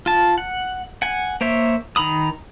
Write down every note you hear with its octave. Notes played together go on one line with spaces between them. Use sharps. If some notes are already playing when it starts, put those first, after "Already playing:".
F4 A5
F#5
F#5 G#5
A#3 C5 C#5 E5
D#3 A#5 B5 D#6